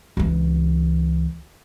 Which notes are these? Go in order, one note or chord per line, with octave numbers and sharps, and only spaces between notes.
C#2 E3